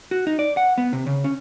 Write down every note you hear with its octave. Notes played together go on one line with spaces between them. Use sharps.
F#4
D#4
D5
F#5
B3
C3
C#3
C#4